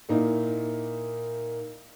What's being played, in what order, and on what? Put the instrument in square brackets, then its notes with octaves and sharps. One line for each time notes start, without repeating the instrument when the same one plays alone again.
[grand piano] A#2 A#3 D#4 E4